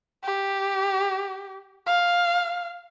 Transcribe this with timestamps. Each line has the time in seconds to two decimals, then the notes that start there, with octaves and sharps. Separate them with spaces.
0.24 G4
1.86 F5